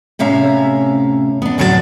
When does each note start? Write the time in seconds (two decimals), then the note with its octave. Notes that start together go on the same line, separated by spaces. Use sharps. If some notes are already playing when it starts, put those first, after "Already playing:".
0.19 A2 C3 C#4 E5 F5 A#5
1.42 B3 D4
1.58 D2 A2 F#3 F#4 A4 D5